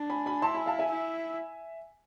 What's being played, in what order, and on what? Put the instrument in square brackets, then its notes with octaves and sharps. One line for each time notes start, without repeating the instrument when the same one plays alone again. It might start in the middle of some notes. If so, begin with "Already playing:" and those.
Already playing: [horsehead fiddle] D4
[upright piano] G#5 B5
G#5 B5
[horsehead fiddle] E4 [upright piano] A5 C6
[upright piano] G#5 B5
F5 A5
E5 G#5
[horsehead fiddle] E4